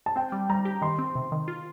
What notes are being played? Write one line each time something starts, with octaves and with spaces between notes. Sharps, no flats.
A5
C4 G5
G3
G3 A#5
G4
D#3 C6
C4
C3
D#3
F4